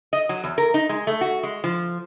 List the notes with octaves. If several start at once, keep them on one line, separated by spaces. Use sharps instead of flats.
D#5
F#3
E2
A#4
D#4
G#3
A3
F#4
G#3
F3